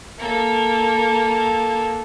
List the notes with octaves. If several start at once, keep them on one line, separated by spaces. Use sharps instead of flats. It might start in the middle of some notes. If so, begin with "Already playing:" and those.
A#3 A4